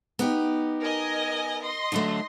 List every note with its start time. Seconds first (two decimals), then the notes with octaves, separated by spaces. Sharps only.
0.19 B3 D#4 G4
0.80 A#4 D#5 G#5
1.62 D#5 C6
1.92 D3 F#3 A3